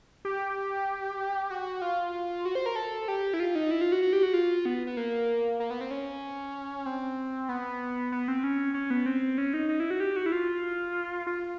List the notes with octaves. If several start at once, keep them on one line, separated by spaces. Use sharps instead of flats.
G4
F#4
F4
F#4
C5
A#4
A4
G4
E4
F4
D#4
E4
F4
F#4
F#4
G4
F#4
F4
B3
B3
A#3
A#3
B3
C4
C#4
C4
B3
B3
C4
C#4
C#4
B3
C4
C#4
D#4
D#4
E4
F#4
G4
F#4
E4
F4
F4